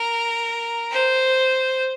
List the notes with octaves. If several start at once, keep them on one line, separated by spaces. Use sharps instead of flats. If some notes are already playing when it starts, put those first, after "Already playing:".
Already playing: A#4
C5